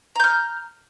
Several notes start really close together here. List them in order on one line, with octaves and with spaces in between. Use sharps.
A#5 G6 F6